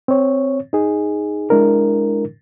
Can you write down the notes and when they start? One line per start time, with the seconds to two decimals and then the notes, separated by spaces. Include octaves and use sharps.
0.08 C4 C#5
0.73 D#4 G#4
1.50 G#3 D4 E4 A#4